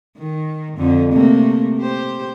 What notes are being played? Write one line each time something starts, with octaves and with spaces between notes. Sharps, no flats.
D#3
F2 D3
C3 A3 A#3
G4 C5